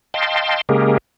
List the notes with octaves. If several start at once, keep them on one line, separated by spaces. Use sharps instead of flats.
D#5 F5 G5 A5 C6
C#3 G#3 A#3 G4 G#4 A#4